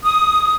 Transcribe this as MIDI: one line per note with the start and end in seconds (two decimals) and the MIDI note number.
0.04 0.55 87